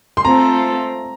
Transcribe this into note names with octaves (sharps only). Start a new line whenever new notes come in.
C6
A3 C4 F4 A4 A#5